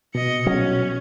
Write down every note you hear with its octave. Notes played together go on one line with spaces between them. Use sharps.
B2 D#5 C#7
F#3 C#4